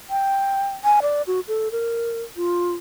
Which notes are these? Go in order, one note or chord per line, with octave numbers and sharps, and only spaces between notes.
G5
G#5
D5
F#4
A4
A#4
F4